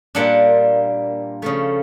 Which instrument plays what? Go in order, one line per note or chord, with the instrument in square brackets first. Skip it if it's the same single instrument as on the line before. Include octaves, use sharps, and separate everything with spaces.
[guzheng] A#2 G3 A#3 D4 F#5
C#3 F3 A3